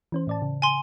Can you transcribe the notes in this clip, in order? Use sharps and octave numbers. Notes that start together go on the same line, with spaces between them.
E3 C#4 C5
A2 D5 A5
C#3
G#5 C6